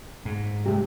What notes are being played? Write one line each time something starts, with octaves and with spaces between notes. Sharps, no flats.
G#2
C3 G#3 A3 G4